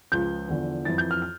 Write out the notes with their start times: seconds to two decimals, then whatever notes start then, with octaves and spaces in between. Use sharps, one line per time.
0.12 C#2 C#3 F3 G6
0.49 E2 D3 F3
0.85 F2 E3 A6
0.98 G6
1.11 F6
1.22 F6